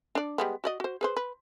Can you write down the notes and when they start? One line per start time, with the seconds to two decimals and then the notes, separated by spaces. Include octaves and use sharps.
0.15 D4 D5
0.38 G3 G#3 B3
0.64 F#4 D5 D#5
0.80 F#4 C5
1.01 G#4 B4 C5
1.17 B4